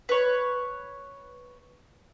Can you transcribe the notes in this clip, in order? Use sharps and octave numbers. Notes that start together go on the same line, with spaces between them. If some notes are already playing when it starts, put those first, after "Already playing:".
B4 C#5